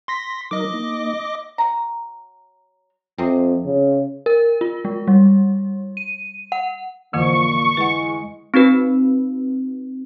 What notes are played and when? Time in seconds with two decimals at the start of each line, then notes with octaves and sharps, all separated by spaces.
0.08 C6 A#6 B6
0.51 F#3 D#4 A#4 D#5 D6
0.73 A#3 D#4
1.58 F#3 A#5
3.18 F2 C3 C4 G#4
3.65 C#3
4.26 A#4
4.61 F4
4.85 G#3
5.08 G3
5.97 D#7
6.52 F#5
7.13 F2 A#2 D3 E3 F3 C#6
7.77 E3 G#3 B4 F#5
8.54 C4 D#4 F#4 B4